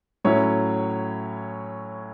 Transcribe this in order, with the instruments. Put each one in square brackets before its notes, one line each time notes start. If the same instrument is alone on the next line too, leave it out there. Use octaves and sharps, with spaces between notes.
[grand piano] A2 F#3 C#4 E4 C#5